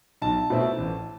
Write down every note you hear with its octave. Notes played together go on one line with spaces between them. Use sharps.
B1 A5
B2 A3 C4 E4
A1